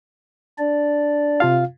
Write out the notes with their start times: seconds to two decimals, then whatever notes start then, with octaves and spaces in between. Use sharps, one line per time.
0.59 D4 D5
1.40 C3 F4 F5